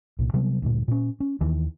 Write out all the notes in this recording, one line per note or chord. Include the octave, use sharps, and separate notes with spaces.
C2 A#2
C3 F#3 G3 B3
D2 G2 A#2
A#2 C#4
C#4
D#2 D#3 E3